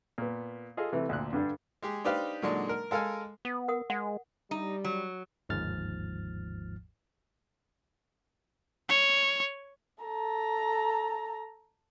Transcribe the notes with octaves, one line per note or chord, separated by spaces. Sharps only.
A#2 B3
F4 G#4 A4 D#5 F5
C3 E3 A3
D2 A#2 F#6
G2 D3 G3 D4
G#3 G4 G#4
D4 D#4 G4 B4 C5 F5
A#2 D3 F#3 G#3 D4 D#4
A#4
G#3 A4 A#4 F5 G#5
B3
A#4 F#5 D#6
G#3 F#5
G3 D#4
F#3
G1 D#2 G#2 F3 F6 A6
C#5
A4 A#5